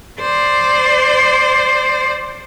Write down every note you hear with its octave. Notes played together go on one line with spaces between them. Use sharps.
C5 D5